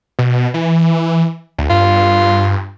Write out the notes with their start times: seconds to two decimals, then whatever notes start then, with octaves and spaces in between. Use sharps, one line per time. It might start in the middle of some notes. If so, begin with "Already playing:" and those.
0.19 B2
0.54 E3
1.58 D2
1.70 G2 F4